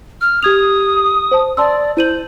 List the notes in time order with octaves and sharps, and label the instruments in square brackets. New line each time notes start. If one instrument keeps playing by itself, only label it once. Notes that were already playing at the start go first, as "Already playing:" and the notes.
[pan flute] F6
[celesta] G4 G#6 F7 [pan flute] D#6
[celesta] C5 A5
[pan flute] D5 [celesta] A5 C6 E6
[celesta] E4 D#7 F#7 [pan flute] C5